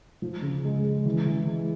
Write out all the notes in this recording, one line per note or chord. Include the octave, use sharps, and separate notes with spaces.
F3
C#3
G#3
G#3
E3
E3
G#3